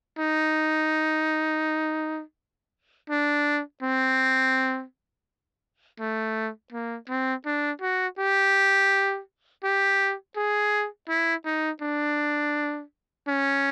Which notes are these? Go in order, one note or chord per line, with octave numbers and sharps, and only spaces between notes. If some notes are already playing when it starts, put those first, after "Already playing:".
D#4
D4
C4
A3
A#3
C4
D4
F#4
G4
G4
G#4
E4
D#4
D4
C#4